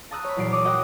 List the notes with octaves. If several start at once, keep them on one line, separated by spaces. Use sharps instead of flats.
A5 A#5 D#6 E6 F#6
C#5 B5
E2 A#2 F#3 C7 D7
C#5 D6 D#6
F#4 A#4 D#5 G5 D#6 F#6